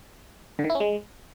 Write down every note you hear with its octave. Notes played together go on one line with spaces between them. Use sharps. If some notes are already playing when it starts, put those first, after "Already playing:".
D3
D#3
E4
C#4
G#3